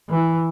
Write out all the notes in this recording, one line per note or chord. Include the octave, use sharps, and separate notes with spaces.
E3